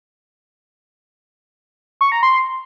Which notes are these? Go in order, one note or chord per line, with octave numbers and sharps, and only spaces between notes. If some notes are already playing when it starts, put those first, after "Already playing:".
C#6
A#5
C6